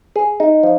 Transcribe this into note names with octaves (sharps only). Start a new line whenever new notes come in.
G#4
D#4
F3